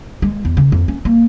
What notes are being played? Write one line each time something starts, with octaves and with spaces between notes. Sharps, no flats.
G#3
E2
C#3
F2
C#4
A#3